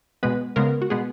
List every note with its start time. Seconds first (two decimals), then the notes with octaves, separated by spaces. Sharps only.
0.23 B2 G#3 B3 B4
0.56 C#3 G#3 B3 A#4
0.82 F#4
0.90 B2 G#3 B3 G#4